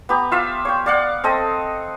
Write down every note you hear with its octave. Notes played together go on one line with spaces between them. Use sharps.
B3 G4 A#5
F4 E5 F5
C#5 G5
D5 F5 F#5
C4 A4 D#5